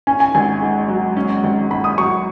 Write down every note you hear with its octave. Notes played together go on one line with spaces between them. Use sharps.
C#4 G#5
G#5
G#1 G#5
G#2
F#3
C#4
G#1
G#2 B5
D#6
F#3 C#6